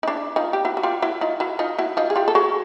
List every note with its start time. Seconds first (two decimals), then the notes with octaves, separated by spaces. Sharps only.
0.03 D#4
0.07 D4 E4
0.36 D#4 F4
0.53 G4
0.65 E4 F#4
0.77 F#4
0.83 F4 G4
1.02 E4 F#4
1.21 D#4 F4
1.40 E4 F#4
1.59 D#4 F4
1.78 E4 F#4
1.97 D#4 F4
2.10 G#4
2.16 F4 G4
2.28 A4
2.35 F#4 G#4